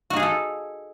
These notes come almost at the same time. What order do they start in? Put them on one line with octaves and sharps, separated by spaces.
F#4 D#4 G#4 F5 A4